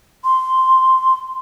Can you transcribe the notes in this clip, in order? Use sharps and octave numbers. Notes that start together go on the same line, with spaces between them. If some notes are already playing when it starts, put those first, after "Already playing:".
C6